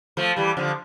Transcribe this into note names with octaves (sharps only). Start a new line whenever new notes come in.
F3 A3
E3 G3
D3 F3